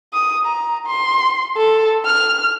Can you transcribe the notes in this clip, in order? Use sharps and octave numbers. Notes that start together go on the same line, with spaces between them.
D#6
A#5
C6
A4
F6